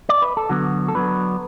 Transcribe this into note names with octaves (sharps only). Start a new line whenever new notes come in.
D5
B4
A4
D3 F#3 B3 F#4
A4
D3 F#3 B3 B4